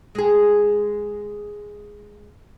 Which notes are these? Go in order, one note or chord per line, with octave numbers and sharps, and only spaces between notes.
G#3 G#4